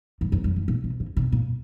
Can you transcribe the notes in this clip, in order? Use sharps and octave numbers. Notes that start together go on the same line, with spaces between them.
F#2
F2
F#2
G#2
A#2
C3
C#3
C3
A#2